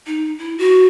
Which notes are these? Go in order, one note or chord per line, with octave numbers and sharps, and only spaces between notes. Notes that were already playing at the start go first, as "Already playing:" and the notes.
D#4
E4
F#4